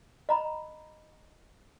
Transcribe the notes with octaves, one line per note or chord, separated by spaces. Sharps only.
D#5 A#5 B5